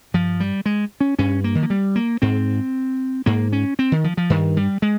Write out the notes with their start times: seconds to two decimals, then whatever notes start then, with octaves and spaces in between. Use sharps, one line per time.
0.14 G2 F3
0.40 G3
0.66 G#3
1.01 C#4
1.19 G2 C#4
1.44 A#3
1.55 D#3
1.63 F3
1.70 G3
1.96 A#3
2.22 G#2 C4
3.26 G#2 A#3
3.52 C#4
3.79 C4
3.92 D#3
4.04 F3
4.17 F3
4.30 G2 D#3
4.57 G3
4.82 G#3